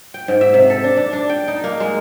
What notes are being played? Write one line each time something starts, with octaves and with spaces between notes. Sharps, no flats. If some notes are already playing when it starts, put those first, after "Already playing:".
G5
G#2
E5
C3
A4
D4
D4
D4
G5
D#4
A#3
G#3